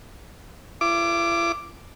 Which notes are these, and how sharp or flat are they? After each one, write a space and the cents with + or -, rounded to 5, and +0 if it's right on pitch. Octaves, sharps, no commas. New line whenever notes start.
E4 +45 D6 +0